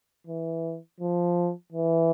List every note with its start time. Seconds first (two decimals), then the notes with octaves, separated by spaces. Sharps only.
0.27 E3
1.00 F3
1.72 E3